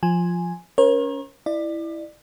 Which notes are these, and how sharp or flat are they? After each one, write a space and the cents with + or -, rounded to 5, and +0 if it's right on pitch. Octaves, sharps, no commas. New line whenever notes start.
F3 +5 G#5 +0
C#4 +20 A#4 +30 C#5 -40
E4 +0 D5 +30